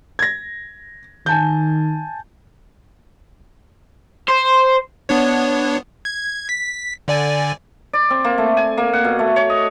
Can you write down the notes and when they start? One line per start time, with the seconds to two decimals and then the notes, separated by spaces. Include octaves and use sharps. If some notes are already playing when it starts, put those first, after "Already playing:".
0.19 G#6 A#6
1.26 D#3 G#5 A5 G6
4.28 C5
5.09 B3 D4 C#5
6.05 G#6
6.49 B6
7.08 D3 D5 G#5
7.93 D5
8.10 C4
8.24 A#3
8.38 A3
8.57 G#5
8.77 A#3
8.93 F#5
9.05 B2
9.19 A3
9.36 C#5
9.50 D#5